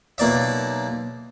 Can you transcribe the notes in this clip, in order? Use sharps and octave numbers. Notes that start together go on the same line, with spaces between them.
B1 A#3 D5 E5